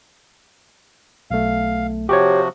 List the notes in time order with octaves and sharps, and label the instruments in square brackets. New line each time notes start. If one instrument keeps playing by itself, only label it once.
[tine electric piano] B1 A3 [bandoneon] F5
[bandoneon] C3 F3 F#4 [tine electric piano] G4 C#5